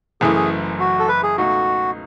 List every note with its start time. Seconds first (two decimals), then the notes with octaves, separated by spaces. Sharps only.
0.21 F#1 F#2 E3 A3 E4 G#4
0.36 G#4
0.80 F#4
0.99 A4
1.08 B4
1.23 G#4
1.38 C#2 B2 A3 D#4 F#4